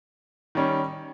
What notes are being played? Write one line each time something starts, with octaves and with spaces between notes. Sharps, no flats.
D#3 G3 C#4